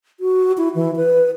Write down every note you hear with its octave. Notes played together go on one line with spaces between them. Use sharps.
F#4
E4
E3
B4